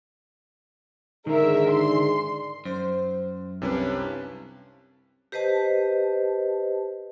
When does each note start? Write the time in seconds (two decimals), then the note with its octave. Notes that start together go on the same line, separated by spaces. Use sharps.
1.27 G#2 D3 D#3 G#4 A#4 D5 E5
1.69 C6
2.65 F#2 C5
3.62 C2 C3 F3 C#4 D4 B4
5.32 G4 B4 C5 D#5 A5